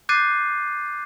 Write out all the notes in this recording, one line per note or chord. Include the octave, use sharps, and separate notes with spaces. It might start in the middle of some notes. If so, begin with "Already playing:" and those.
D6 F#6 G6 A6 C7 D#7